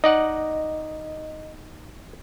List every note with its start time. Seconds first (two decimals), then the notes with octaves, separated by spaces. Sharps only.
0.04 D#4 D5 D#5 F#5